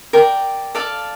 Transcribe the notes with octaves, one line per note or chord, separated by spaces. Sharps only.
A#4 D5 G5
A4 D5 F5 A5